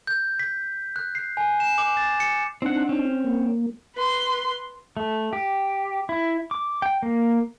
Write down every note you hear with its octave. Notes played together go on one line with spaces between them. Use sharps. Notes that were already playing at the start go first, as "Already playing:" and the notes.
G6
B6
F#6
C7
G#5
E7
D6
A6
C#7
C4 D4 D#4 F#5
C4 C#4
A#3
B4 C6
A3
G4
E4
D6
G5
A#3